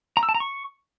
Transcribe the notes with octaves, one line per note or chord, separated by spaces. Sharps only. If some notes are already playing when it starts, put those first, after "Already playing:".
A#5
E6
A5
A#5
C#6